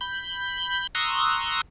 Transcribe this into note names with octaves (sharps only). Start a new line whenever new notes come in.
B5 G6
A#5 C6 C#6 D#6 E6 F#6